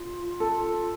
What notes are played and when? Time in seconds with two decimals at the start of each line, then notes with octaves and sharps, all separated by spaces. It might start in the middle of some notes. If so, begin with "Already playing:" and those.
Already playing: F4
0.40 A4